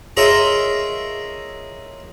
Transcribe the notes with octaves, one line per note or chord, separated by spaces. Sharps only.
F4 G#4 A#4 C#5 D#5 E5